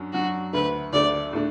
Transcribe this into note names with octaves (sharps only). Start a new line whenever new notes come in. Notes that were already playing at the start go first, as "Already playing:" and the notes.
Already playing: F#2 F#3 D4
F#2 F#3 D4 F#4
D2 D3 A3 B4
D2 D3 A3 D5
A2 A3 D4